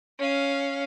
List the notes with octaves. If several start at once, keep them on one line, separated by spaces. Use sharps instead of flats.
C#4 F5